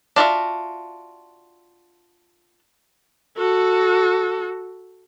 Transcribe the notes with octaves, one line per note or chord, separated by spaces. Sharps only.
D4 F4 F#4 E5
F#4 A4